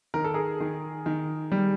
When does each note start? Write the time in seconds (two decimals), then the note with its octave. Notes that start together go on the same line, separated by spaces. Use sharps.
0.14 D#3 A#4
0.24 A4
0.34 G#4 A#4
0.60 D#3
1.06 D#3
1.52 G3